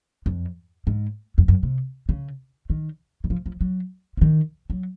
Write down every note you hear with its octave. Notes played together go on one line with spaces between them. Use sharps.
F2
G#2
F2
F#2
C3
C#3
D#3
D#3
F3
F3
F#3
F3
D#3
F#3